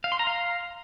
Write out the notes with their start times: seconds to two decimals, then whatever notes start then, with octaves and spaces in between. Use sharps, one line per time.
0.04 F5
0.12 C6
0.19 A#5
0.27 F5